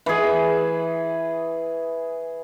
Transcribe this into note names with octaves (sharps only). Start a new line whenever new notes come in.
E3 G#4